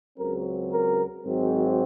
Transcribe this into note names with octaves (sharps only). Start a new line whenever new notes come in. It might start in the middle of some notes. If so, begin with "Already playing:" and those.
C#2 C#3 F#3 C4 A#4
A#4
G#1 G#2 F#3 C4